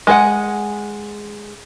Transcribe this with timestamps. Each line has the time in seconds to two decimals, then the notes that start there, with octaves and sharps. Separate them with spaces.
0.07 G#3 G#4 B4 F#5